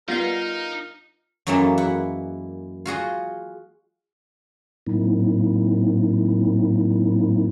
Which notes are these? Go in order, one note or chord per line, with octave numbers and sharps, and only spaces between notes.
G3 B3 D#4 F4 A#4 F5
F#2 E3 F#3 G#3 A#3 A4
E4 F#5
F4 F#4 G#4 D#5
A2 F#3 A#3 C4 D#4 E4